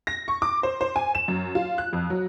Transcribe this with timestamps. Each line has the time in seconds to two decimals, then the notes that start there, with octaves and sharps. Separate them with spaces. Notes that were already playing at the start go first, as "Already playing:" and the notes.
0.07 A#6
0.28 C#6
0.42 D6
0.63 C5
0.81 C5
0.96 G#5
1.15 E7
1.28 F#2
1.55 F4
1.78 F#6
1.93 F2
2.10 F#3